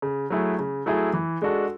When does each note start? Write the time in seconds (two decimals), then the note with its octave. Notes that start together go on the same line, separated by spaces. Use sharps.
0.02 C#3
0.30 F#3 A3 E4 G#4
0.59 C#3
0.86 F#3 A3 E4 G#4
1.13 E3
1.42 G#3 D4 F#4 A4